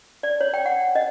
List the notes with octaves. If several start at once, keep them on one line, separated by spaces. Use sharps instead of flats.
D5
C#5
G5
F#5
D#5